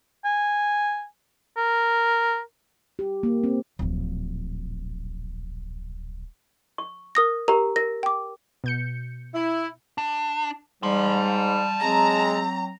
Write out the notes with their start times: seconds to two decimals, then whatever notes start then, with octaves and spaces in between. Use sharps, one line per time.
0.25 G#5
1.57 A#4
2.99 G4
3.23 A#3
3.44 C4
3.79 D1 A#1
6.78 C#6
7.15 A#4 D#6 A#6
7.48 G4 A#4 A#5
7.76 A#4 A#6
8.03 G5 D6
8.64 B2 G6 C#7
9.34 E4
9.98 D4
10.83 G#2 G3 A5 C6
11.82 F#3 G#3 C4 A#5